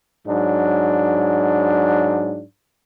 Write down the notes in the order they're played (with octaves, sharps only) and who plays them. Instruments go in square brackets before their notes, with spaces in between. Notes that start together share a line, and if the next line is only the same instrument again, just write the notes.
[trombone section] G#2 F#3 D4